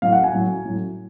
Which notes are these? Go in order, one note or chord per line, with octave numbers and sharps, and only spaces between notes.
A2 F#3 F5
F#5
G#5
A2 F#3
A2 F#3